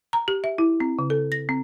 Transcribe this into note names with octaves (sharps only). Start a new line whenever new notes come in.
A#5
G4
E5
E4
C4
C#3
A4
A#6
C4